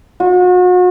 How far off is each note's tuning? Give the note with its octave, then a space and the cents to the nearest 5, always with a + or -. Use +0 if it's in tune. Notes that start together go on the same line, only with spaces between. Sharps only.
F#4 -40